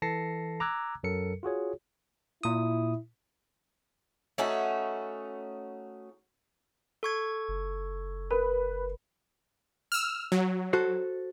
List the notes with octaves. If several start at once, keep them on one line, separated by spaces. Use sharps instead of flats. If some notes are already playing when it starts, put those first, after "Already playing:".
E3 A4 A5 A#6 C7 C#7
A#5 D6 E6 F#6 G#6
F#2 F#3 A4 A#4 C#7
F4 F#4 G#4 C#5
A#2 E4 D#6
A3 C#4 D#4 F#4
A4 C#6 G#6
F#1
A#4 B4
E6 F6
F#3
F#4 A4 C5